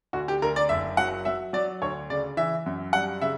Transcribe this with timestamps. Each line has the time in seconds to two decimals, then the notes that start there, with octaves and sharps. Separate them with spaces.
0.13 D2 F#4
0.28 G4
0.42 D2 A#4
0.56 D5
0.69 F#1 E5
0.97 F#3 F#5
1.25 F#3 E5
1.53 F#3 D5
1.82 D2 C#5
2.10 C#3 D5
2.37 E3 E5
2.66 F#2
2.93 G3 F#5
3.22 C#3 E5